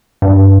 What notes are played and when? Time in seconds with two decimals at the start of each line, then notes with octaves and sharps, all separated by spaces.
0.22 G2